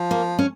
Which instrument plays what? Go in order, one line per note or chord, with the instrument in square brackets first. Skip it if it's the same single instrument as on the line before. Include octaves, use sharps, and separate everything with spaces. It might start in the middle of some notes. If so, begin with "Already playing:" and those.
Already playing: [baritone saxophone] F3
[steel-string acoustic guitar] A#3
C#4